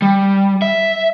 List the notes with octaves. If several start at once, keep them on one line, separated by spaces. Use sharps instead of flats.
G3
E5